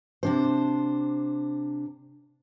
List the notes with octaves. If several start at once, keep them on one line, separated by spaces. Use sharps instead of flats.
C3 D4 C5